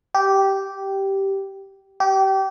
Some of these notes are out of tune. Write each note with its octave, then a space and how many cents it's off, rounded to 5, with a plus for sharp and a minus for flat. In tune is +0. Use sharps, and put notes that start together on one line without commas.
G4 -10
G4 -25